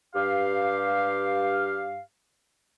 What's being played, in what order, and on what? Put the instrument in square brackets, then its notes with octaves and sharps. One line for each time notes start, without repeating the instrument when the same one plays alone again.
[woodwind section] G2 G4 F5